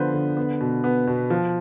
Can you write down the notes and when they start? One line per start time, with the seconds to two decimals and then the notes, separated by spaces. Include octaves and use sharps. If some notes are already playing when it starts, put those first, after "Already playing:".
Already playing: D3 F3 B3 B4 C5
0.14 D3
0.37 B3
0.60 B2
0.84 B3
1.07 B2
1.30 F3